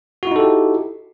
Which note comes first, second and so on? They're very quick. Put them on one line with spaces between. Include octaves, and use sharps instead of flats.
F#4 E4 D#4 A4 G4